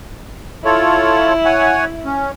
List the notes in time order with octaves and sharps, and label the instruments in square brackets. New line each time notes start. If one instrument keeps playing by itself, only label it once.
[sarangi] E4 [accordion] F4 A4 C#5
[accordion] C#5 F#5 G#5
C#4